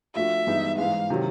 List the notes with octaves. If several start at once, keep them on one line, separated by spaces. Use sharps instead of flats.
F3 A3 D4 F#4 E5
G2 E3 G#3 B3 D#4
G#2 E3 G#3 F5
C3 D#3 F#3